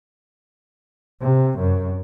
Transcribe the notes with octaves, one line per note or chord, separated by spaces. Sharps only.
C3
F#2